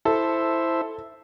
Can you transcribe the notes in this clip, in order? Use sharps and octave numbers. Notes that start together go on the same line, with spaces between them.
E4 A4 C5 E5